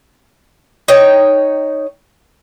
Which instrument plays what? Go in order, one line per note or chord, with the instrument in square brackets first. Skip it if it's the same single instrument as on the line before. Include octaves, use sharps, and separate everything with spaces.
[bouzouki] D#4 C#5 G5